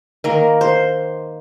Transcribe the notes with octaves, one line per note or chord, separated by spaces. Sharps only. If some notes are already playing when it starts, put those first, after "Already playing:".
D#3 A#3 A#4
C5